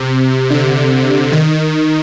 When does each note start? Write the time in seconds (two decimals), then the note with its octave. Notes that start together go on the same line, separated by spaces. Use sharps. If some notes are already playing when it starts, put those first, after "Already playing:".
Already playing: C3
0.50 D3
1.32 D#3